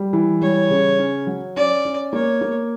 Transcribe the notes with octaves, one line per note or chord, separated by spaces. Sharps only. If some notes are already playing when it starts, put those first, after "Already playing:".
Already playing: G3
E3
G3 C#5
C#3
C#4
F#3
C#4 D5
C#4
A#3 C#5
A#3